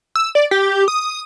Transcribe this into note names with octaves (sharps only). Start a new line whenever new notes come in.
E6
D5
G4
D#6